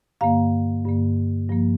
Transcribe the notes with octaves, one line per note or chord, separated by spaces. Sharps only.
G2 D3 A#3 F5 A#5
G2 D3 A#3
G2 F3 A#3